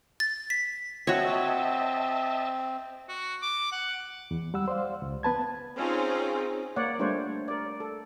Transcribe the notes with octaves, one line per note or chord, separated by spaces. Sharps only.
A6
B6
C4 F#4 C#5 D#5 E5 A5
F#4
D6
F#5
E2
G3 F#5 E6
C5 D5 F5
C#2
B3 B4 A5 G#6
C4 C#4 D#4 F4 G#4
A#3 C#5 D5 F#5
G3 A3 D4 F4 C5 C#5
A#4 D5
A4